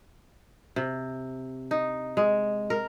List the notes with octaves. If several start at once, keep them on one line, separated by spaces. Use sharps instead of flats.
C3
D#4
G#3
A#4